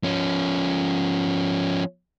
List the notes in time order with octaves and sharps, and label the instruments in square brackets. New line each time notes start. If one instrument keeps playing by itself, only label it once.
[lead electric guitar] F3 C#4